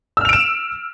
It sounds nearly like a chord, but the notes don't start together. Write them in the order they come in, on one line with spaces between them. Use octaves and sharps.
E6 F6 F7 D7 E7